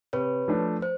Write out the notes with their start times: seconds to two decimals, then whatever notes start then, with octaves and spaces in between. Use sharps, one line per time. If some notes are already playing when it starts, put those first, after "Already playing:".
0.13 C3 B4 C#5
0.48 F3 A3 D4
0.82 C5